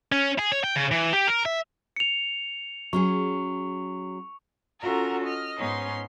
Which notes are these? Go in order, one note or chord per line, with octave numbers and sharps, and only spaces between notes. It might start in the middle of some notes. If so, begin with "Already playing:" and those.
C#4
G#4
C#5
G5
C#3
E3
G4
A#4
E5
C#7 F7
F#3 C#4 G#4 C#6
C#4 F4 F#4 A4 A#4 A#5
D#5 F6
G#2 B3 C#4 D#4 C6